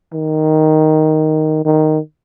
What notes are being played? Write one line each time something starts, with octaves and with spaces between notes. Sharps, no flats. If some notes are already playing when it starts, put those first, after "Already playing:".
D#3
D#3